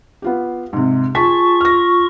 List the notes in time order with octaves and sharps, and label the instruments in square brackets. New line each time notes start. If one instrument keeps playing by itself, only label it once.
[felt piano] B3 F4 G4
G#2 C3
[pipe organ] F4 C#6 [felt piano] G#4 A5 B6
[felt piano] F6 A#6